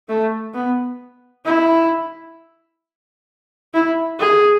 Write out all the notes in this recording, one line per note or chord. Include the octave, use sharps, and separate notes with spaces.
A3
B3
E4
E4
G#4